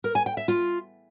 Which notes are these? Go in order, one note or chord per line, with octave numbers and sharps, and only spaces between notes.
A#4
G#5
G5
E5
F4